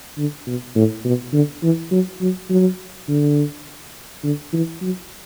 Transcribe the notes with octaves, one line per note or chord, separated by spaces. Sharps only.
D3
B2
A2
B2
D3
E3
F#3
F#3
F#3
D3
D3
E3
F#3